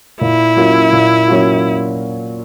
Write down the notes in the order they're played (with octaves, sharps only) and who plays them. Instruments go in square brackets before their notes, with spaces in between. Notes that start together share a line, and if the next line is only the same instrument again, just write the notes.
[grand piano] A#2 [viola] E4
[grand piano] F#3 A#3 C#4 F4
A#2
F#3 A#3 C#4 F4